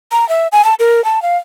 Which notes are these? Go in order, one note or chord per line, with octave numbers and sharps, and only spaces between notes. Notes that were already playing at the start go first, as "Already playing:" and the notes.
A#5
E5
G#5
A5
A#4
A5
F5